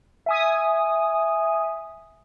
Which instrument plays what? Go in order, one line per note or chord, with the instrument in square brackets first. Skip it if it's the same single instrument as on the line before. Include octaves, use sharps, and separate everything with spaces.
[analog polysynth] E5 G#5 D#6